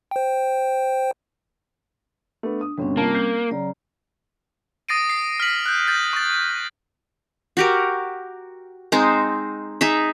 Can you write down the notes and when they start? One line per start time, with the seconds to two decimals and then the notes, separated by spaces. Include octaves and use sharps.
0.11 C5 G5
2.43 A3 B3 D4
2.61 D#6
2.78 G1 B2 D3 G3 C4 C#4
2.97 C3 A#3 F4 A5
3.14 G6 C7
3.51 C#3 F#3 D5 A#5
4.89 D#6 A6 A#6 C7 D7 D#7
5.09 C7
5.40 F6 B6 F#7
5.66 F#6 G6
5.88 G6 A6
6.13 C#6 A6
7.57 F#4 G4 A#4
8.92 G#3 C4 D#4 C5
9.81 D#4 G#4 E5